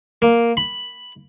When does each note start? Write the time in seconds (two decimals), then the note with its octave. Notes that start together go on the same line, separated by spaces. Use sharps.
0.22 A#3
0.57 B5